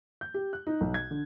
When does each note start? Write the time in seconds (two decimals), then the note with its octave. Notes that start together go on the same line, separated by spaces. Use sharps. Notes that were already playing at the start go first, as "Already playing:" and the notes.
0.21 G6
0.34 G4
0.53 F#6
0.67 D#4
0.81 B1
0.94 G#6
1.11 D3